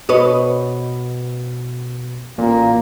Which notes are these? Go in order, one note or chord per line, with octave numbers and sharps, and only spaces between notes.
B2 B4 C#5 D#5
A1 A#2 A#3